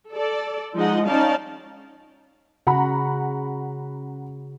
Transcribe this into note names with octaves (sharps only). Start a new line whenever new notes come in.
A4 D5
F3 G#3 D#4 D#5 F#5
C#4 D#4 D5 F5 A5
C#3 F#4 F#5 A#5 B5